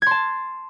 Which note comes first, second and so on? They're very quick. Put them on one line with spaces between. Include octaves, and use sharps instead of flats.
G#6 C6 A5